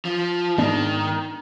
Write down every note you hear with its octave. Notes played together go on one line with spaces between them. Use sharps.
F3
G#2 D#3 B3 D4